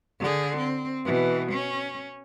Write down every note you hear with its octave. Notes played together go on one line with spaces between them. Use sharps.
D3 G#4
C4
B2 E3
C#4